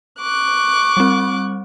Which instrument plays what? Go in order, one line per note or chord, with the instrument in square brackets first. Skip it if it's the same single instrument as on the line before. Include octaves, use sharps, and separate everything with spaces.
[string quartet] C#6 D6 F#6
[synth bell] G3 C4